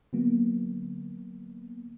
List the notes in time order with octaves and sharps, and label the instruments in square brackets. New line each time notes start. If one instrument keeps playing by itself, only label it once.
[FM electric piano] D3 F#3 A#3 B3